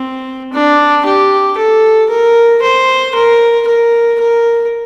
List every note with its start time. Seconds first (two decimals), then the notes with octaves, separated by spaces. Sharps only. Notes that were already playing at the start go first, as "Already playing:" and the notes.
Already playing: C4
0.53 D4
1.05 G4
1.57 A4
2.09 A#4
2.62 C5
3.15 A#4
3.67 A#4
4.20 A#4